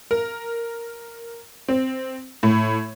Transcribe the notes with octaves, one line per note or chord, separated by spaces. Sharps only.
A#4
C4
A2